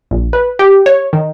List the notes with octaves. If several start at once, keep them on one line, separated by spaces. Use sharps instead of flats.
A#1
B4
G4
C#5
D#3